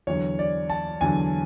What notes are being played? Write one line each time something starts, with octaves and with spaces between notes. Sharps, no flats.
E2 D3 F#3 C#5
D5
A5
E2 D3 F#3 G#5